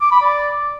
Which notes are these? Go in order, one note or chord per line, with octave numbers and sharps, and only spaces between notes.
D6
B5
D5